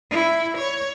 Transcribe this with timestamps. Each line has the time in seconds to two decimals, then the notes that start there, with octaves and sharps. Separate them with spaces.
0.11 E4
0.58 C#5